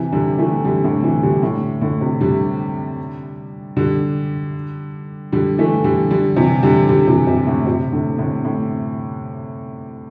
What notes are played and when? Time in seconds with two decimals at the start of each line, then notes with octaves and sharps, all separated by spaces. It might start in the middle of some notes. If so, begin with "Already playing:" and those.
Already playing: C3 E3
0.12 D3 G3
0.38 E3 A3
0.65 D3 G3
0.84 A2 D3
1.03 C3 E3
1.23 D3 G3
1.43 A2 D3
1.81 A2 D3
2.01 C3
2.21 D3 G3
3.77 D3 G3
5.32 D3 G3
5.58 E3 A3
5.84 D3 G3
6.11 D3 G3
6.36 C3 E3
6.63 D3 G3
6.89 D3 G3
7.07 C3 E3
7.27 C3
7.47 A2 D3
7.66 C3
7.92 A2 D3
8.18 A2 D3
8.45 A2